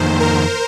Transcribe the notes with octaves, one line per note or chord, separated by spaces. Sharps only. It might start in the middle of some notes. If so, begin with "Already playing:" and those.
Already playing: F2 D#3 A#3 C5
A#4